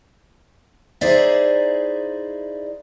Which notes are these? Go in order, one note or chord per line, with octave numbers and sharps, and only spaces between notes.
D#4 E4 G#4 C5 D5 E5